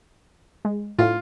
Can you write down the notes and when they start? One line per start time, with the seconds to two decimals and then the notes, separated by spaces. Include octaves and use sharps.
0.65 G#3
0.99 A2 F4